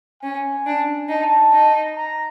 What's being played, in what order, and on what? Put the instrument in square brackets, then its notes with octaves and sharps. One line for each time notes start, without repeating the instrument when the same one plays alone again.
[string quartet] C#4 [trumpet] G#5
[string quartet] D4
[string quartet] D#4 [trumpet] A5
[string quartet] D#4
[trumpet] A#5